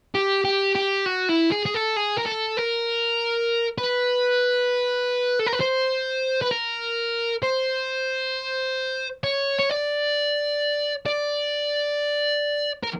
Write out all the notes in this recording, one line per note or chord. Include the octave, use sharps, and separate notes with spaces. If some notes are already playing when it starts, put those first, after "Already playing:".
G4
G4
G4
F#4
E4
G#4
G#4
A4
G#4
A#4
A4
A#4
B4
A4
A#4
B4
C5
B4
A#4
C5
C#5
C#5
D5
D5
A#4